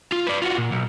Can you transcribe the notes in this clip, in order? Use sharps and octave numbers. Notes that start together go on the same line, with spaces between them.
F4
B4 D5
F4 F#4
A#2
B1